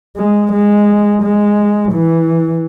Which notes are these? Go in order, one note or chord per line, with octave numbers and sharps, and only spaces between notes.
G#3
G#3
G#3
E3